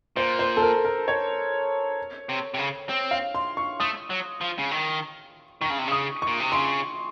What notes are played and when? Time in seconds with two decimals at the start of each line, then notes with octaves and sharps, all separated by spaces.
0.16 A#2 C5
0.39 C5
0.57 A4
0.62 A#4
0.85 A#4
1.08 C#5
2.29 C3
2.54 C3
2.59 C#3
2.89 C4
3.11 F5
3.35 C6
3.57 C#6
3.80 A3 D#6
4.10 F#3
4.41 F3
4.58 C#3
4.71 D#3
5.61 D#3 C#6
5.70 C#3
5.78 C3
5.87 C#3 D#6
6.22 A#2 C#6
6.40 C3
6.52 C#3 C6